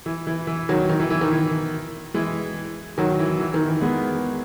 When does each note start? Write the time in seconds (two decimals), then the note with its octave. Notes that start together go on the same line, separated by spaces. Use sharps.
0.06 E3
0.27 E3
0.47 E3
0.69 D#3 F#3
0.89 D#3
1.00 E3
1.10 E3
1.21 D#3
1.31 E3
2.14 E3 G#3
2.98 D#3 F#3
3.19 E3
3.40 E3
3.54 D#3
3.68 E3
3.81 G#3 B3